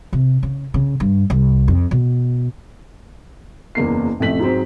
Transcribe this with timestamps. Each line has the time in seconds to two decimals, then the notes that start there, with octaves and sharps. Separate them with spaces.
0.13 C3
0.43 C#3
0.74 C#3
1.00 G2
1.30 C2
1.68 F2
1.91 B2
3.75 F#1 E2 A#3 C7
4.20 A1 F2 C3 A3 B6 F#7
4.39 G#2 F#3 G#3 C4